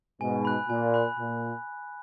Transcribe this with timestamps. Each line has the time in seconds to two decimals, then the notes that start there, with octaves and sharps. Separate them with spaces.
0.21 G#2 B2 G#5
0.45 B5 F#6
0.69 A#2 G#5
0.94 B5 F#6
1.17 A#2 B5